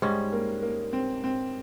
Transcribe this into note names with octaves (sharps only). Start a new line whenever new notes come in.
G#2 G3 G#3 C#4
A#3
A#3
C4
C4